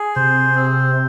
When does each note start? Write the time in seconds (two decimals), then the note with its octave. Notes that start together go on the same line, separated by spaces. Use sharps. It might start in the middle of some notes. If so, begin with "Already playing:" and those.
Already playing: G#4
0.16 C3 C5
0.55 C4